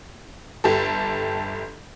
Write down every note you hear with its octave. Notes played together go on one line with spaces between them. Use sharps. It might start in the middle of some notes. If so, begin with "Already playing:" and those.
G1 G4 A4